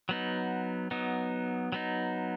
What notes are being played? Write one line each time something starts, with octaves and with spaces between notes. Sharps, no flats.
F#3 B3 D#4
F#3 B3 D#4
F#3 B3 D#4